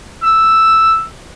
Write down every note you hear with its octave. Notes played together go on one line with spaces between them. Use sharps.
E6